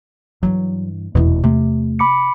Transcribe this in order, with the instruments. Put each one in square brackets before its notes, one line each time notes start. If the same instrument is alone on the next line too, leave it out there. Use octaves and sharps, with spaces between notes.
[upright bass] G2 E3 [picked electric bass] F#3
[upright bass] F1 E4 [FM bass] E2 [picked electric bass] B2
[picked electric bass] C3 [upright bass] A3
[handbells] B5 D6 C#7